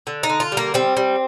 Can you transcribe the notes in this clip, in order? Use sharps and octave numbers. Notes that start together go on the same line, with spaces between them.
D3
D#4
D3
F4
G3
A#3
G3 C4
G3